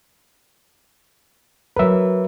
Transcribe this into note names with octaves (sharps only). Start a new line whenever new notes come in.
F#3 A#4 B4 E5